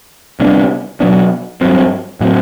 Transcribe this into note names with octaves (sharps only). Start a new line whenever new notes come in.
C3 G3 B3 D4
B2 F#3 B3 D4
G2 F#3 C4
A2 F#3 C4